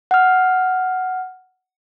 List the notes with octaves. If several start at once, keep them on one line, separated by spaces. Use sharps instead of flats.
F#5 F6